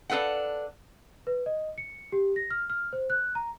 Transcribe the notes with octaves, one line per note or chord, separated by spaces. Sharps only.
D4 A4 B4 F5 F#5
B4
D#5
C#7
G4
A#6
F6
F6
C5
F#6
A#5